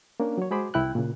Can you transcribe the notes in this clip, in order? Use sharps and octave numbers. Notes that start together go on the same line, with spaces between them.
A#3 C#4 D4 A#4
F#3 C#5
G#3 F#4 G#4 C5 B5 D6
C2 E4 G5 F#6
A#2 C#3